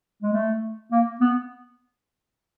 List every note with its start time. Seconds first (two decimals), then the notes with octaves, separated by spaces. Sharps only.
0.22 G#3
0.33 A3
0.91 A#3
1.21 B3